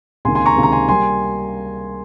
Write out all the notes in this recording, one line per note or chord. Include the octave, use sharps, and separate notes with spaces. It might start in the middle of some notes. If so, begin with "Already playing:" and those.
C#2 C3 D#3 A#3 G#5 C6
G#5 C6
A#5 C#6
C#2 C3 D#3 A#3
A#5
G#5 C6
G3 A#3 G#5 C6